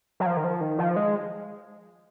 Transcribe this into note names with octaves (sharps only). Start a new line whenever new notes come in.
F#3
F3
D#3
F3
D#3
F3
G#3